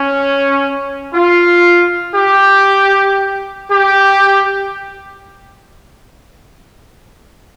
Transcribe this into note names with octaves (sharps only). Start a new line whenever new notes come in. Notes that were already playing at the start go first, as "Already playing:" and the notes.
Already playing: C#4
F4
G4
G4